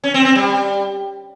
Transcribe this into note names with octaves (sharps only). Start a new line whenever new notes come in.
C#4
C4
C4
G3